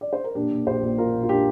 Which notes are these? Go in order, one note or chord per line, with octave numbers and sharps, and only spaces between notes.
D5
C5
A#4
A#2 D4 G4
A#2
A#1 G4 C5
A#1
A#2 F4 A#4
A#2
F4
D4 G4